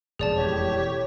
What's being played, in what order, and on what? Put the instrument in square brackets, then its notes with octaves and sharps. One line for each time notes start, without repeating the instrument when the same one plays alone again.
[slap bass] E1 F2 [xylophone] G#4 D5 A5
[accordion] A2 G4 [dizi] C#5